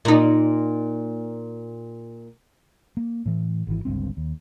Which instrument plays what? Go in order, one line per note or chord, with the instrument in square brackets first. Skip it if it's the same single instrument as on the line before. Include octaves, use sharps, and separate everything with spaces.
[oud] A#2 D#4
[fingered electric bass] A#3
A2 E3
G#1 E3
G1 C#2 G2 C4
D#2